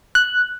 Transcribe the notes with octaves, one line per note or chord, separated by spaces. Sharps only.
F#6